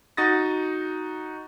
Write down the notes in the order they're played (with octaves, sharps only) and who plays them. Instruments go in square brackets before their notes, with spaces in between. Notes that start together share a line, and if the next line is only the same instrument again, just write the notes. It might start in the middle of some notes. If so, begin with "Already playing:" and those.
[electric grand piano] D#4 F#4 D#6 A6 A#6